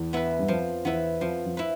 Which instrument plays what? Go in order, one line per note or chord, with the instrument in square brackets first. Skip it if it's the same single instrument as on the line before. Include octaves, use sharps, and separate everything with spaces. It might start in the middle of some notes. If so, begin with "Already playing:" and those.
Already playing: [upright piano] E2
[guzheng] B3 E4 B4
[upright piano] G2
[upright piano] F2 [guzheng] F3
[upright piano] E2 [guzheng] B3 E4 B4
[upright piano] F2 [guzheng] F3
[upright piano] F2
[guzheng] E4 B4